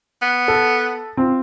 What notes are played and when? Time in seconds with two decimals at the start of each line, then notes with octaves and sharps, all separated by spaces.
0.22 B3
0.48 A4
1.17 C4 F4